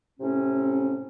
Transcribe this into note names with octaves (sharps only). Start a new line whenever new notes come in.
A2 C3 C4 C#4